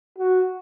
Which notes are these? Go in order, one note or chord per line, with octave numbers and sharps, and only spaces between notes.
F#4